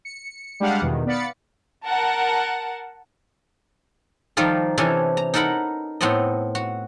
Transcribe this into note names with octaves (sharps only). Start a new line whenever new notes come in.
C#7
G3 G#3 D4 G4 F5 F#5
E2 B2 D#3
B3 D5 F5 B5 A6 C#7
A#4 F#5 A5
D#3 F3 G3 D#4 F4 A4
C3 E3 C#4 D4 A4 G#5
A#5
D#4 A4 A#4 F#5 B5
A2 B3 C4 A4 D#5
F#4